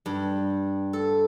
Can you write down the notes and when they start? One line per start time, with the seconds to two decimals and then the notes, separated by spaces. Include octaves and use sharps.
0.06 G2
0.93 A4